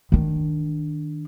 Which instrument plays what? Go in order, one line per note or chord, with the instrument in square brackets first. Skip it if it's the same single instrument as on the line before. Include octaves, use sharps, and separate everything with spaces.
[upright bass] D#3 D4